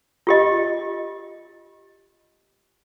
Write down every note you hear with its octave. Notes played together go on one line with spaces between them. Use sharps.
F4 G4 D#5